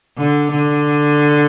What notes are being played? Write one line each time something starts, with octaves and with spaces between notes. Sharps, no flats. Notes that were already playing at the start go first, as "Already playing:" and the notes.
D3
D3